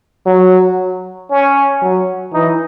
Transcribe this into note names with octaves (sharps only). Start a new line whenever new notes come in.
F#3
C#4
F#3
E3 D#4